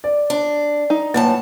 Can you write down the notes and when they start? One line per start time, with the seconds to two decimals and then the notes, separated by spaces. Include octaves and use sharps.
0.04 D5
0.30 D4
0.90 D#4
1.14 F#2 A2 A#3 B4 F#5 A5